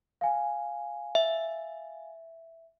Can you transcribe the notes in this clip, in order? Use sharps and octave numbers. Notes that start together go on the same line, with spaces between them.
F5 G#5
E5